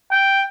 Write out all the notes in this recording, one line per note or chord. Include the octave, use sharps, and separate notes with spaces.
G5